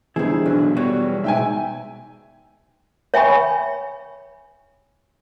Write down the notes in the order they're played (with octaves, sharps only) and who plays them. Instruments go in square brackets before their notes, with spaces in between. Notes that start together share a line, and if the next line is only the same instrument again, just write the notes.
[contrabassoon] G1 [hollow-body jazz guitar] D#3 E4 [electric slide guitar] E3 C5 [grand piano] G#4
[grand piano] B1 [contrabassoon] D3 [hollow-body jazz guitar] F#3
[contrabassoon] E2 [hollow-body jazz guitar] G3 [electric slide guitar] F#4 B4 C#5
[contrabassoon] G#2 [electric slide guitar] B2 [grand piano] E5 G5 G#5
[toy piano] C#5 E5 G5 G#5 B5 C#6